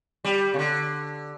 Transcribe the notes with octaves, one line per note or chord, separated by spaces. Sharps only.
G3
C#3
D3